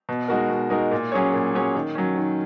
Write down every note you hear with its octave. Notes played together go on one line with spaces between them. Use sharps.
B2
G#3 D#4 F#4 A#4
B2
G#3 D#4 F#4 A#4
A#2
F#3 C#4 G#4 C#5
A#2
F#3 C#4 G#4 C#5
D#3
F#3 C#4
D#3